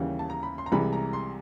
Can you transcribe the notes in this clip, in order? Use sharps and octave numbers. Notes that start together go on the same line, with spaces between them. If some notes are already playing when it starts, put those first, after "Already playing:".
Already playing: D#2 C#3 E3 G3
A5
A#5
B5
C6
A#5
C2 C3 E3 G#3 B5
A#5
C6